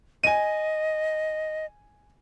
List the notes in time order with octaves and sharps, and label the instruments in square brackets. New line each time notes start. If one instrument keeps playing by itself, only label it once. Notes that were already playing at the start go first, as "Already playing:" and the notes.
[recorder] D#5 [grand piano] G#5 D#7